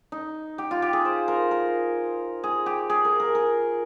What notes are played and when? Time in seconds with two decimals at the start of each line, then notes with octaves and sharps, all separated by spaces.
0.12 D#4
0.58 G4
0.71 F4
0.82 G4
0.93 G#4
1.05 C5
1.28 A#4
1.51 A#4
2.44 G#4
2.66 G4
2.90 G#4
3.05 A#4
3.20 A#4
3.35 A#4